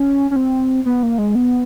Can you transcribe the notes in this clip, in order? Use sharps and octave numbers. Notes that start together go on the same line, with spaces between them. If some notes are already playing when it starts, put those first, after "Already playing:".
Already playing: C#4
C#4
C4
B3
A#3
G#3
B3